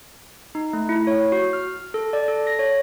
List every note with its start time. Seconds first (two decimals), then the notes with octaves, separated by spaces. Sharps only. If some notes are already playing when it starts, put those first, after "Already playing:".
0.55 D#4
0.73 A3
0.89 E4
1.07 C#5
1.32 F#4
1.53 F6
1.94 A4
2.13 D5
2.28 A4
2.47 A#6
2.59 C#5